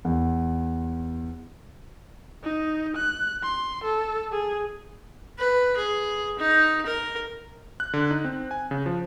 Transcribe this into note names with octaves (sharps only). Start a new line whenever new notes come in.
E2
D#4
F#6
C6
A4
G#4
B4
G#4
D#4
A#4
F#6
D3
D#4
C4
G#5
C#3
F3